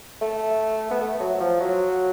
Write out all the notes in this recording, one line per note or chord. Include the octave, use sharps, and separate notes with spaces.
A3
B3
A3
F#3
F#3
F3
F#3